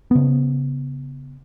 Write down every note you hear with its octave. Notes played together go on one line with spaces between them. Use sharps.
C#3 B3